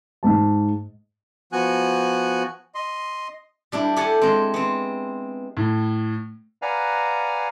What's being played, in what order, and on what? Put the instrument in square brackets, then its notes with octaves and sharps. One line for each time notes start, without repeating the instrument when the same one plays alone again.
[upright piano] G#2 A5
[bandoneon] F3 B3 F#4 G#5 F#6
D#5 C6
[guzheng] G3 D4 E4
G4 A4 F#5 G#5 A5
G#3 C4
B3 C4
[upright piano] A2
[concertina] B4 D5 F5 F#5 G#5 A#5